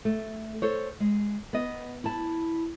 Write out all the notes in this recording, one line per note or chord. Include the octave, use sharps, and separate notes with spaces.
A3
A4 C5 C#5
G#3
B3 D#5
E4 A5